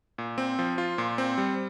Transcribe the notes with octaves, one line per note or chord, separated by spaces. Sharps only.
A#2
C4
F3
F4
A#2
C4
G3